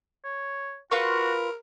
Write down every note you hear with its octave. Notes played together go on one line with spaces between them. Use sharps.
C#5
F4 F#4 A#4 B4 C#6